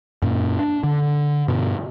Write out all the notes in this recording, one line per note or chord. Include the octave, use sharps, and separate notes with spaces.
F#2 A#2
D4
D3
G2 B2